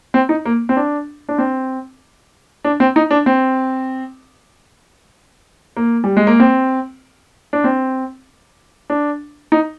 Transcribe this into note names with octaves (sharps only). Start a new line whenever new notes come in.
C4
D#4
A#3
C4
D4
D4
C4
D4
C4
D#4
D4
C4
A#3
G3
G#3
A#3
C4
D4
C4
D4
D#4